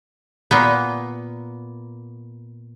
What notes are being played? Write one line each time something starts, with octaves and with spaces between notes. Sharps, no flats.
A#2 A#3 B3